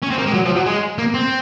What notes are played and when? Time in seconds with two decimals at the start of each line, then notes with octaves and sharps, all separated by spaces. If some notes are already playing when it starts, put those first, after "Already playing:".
0.02 C#4
0.10 C4
0.18 A#3
0.26 G#3
0.34 F#3
0.45 F3
0.56 F#3
0.66 G#3
0.98 A#3
1.14 C4